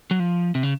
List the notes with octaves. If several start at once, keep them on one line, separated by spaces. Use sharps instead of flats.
F#3
F3
C3
C#3